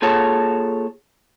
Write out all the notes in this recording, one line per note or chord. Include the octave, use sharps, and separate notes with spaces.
A#3 F4 G#4 A4 C#5 A5